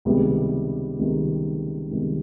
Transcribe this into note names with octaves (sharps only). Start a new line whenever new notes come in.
C#2 C3 D#3 G3 B3
C#2 C3 D#3 G3 B3
C#2 C3 D#3 G3 B3